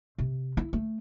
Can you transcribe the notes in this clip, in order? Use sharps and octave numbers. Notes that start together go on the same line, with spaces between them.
C3
E4
A3